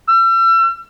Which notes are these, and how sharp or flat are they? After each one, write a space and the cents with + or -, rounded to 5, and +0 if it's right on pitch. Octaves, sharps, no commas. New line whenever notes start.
E6 +40